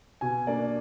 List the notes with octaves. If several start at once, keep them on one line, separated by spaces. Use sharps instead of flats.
B2 G#5
A#3 D4 D5